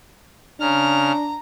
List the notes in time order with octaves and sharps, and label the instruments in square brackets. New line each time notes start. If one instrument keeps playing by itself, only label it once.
[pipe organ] C#3 F6 [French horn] D4 [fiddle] A#5